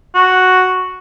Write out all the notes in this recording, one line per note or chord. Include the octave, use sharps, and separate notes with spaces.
F#4